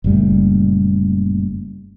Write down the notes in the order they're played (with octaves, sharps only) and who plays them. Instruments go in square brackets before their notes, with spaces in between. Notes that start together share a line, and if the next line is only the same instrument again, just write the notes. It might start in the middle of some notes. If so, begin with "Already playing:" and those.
[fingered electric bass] F#1 A#2 G3 A3